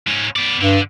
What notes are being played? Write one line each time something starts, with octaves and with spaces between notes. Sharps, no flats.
G#2 C#4
B3 D5
G2 D3